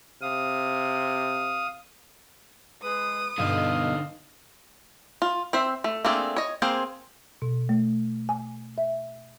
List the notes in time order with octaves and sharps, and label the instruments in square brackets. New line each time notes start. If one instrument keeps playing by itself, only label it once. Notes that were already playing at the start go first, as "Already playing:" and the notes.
[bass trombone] C3 [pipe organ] F5 D#6
[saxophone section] G#3 B4 [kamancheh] D#6
[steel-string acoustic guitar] G2 B2 [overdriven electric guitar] D3 D#4 [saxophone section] A4 D#5 F5
[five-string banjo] F4
C4 C5 E5
A3
A3 A#3 C4 D4 G#4
C#5 D#5
A#3 C4 G#4 C5
[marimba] B2
A3
G#5
E5